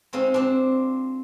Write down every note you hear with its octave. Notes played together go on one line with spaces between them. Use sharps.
G#3 C4 D#4 F4
C4 D4